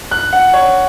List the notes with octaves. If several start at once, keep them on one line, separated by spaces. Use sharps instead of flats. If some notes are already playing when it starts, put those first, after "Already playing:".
F#6
F#5
C#5